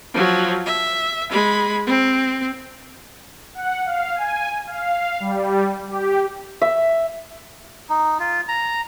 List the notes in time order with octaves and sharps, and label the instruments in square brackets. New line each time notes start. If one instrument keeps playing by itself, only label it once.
[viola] F3 F#3
E5
G#3 B5
C4
[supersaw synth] F#5
F5
G#5
F5
G3
G4
[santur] E5
[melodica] D#4
F4
A#5